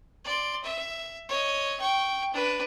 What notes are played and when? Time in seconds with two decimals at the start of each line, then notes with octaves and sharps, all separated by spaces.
0.25 D5 C6
0.64 E5
1.29 C#5 D#5
1.80 G5 C#6
2.34 D4 B4